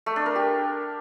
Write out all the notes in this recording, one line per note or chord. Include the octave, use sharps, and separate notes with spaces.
A3
D4
A#4
G4